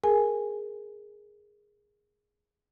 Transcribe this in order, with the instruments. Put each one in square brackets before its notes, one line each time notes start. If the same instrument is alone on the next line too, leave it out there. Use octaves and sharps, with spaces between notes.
[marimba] G#4 A#4 G#5